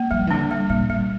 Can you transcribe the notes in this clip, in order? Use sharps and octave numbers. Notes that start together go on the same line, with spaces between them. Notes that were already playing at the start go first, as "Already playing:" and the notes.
Already playing: A#3
F3 G3
E3
D3 D4
G3
A#2 G3
A#2 G3